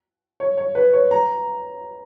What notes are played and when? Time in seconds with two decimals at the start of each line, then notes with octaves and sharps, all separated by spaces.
0.40 C#5
0.57 C#5
0.75 B4
0.93 C#5
1.11 A#5